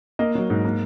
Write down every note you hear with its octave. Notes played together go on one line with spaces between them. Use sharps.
A#3 D#5
F#3
G#2
A#3